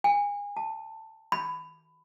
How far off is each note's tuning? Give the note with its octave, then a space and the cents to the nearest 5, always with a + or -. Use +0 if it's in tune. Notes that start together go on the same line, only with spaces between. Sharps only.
G#5 -30
A5 +15
B5 +15